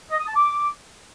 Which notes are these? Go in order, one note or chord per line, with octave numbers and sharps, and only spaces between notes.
D#5
D#6
A5
D6